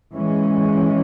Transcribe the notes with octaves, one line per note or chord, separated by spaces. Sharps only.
E3 G#3 C#4